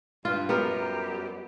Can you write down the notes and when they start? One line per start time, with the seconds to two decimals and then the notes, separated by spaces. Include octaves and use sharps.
0.25 G2 F4
0.49 F#2 G3 B3 G4 A#4